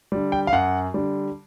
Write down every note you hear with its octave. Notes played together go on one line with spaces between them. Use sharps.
D3 G3
G5
F5
F#2 F#5
D3 G3